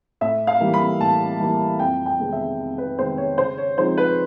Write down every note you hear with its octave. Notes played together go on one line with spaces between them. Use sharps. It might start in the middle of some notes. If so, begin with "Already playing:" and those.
A2 E5
F5
E3 G3 A#3
B5
A2 A5
E3 G3 A#3
F2 G5
G5
C3 D#3 G#3 B3
E5
F2
B4
C3 D#3 G#3 B3 C5
C#5
C#3 C5
C#5
F3 G#3 C4 D#4 C5
B4